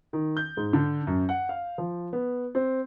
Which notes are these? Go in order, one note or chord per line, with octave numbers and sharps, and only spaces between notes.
D#3
G6
G#2
D3
F#2
F#5
F5
F3
B3
C4